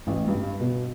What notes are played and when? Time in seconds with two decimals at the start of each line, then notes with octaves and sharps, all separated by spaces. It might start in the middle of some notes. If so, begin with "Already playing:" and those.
0.07 A1
0.27 G2
0.60 B2